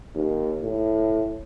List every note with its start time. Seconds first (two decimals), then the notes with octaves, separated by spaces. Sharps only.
0.15 D#2
0.63 A2